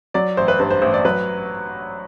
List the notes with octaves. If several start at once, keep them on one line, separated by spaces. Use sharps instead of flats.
F#3 D5
A1 C5
B4
G2 B4
C5
A1 C5
D5
F#3 B4